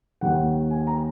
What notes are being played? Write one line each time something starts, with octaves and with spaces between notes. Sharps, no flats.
D#2 D#3 F#5
G#5
A#5